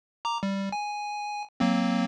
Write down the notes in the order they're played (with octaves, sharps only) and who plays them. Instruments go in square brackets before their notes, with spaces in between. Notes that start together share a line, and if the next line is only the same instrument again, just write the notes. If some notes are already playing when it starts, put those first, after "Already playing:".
[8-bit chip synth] A#5 D6
G3
G#5
F#3 A#3 C4